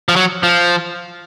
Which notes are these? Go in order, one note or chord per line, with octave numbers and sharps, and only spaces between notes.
F3
F#3
F3